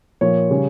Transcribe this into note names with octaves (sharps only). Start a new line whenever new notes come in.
A#2 F3 C#5
C#3 G3